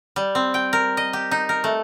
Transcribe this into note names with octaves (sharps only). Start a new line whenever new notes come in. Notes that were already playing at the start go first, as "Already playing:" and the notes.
G3
C4
G5
A#4
D#5
G4
D#4
A#4
A3